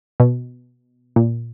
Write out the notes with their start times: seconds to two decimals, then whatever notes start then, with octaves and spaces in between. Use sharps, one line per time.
0.20 B2
1.16 A#2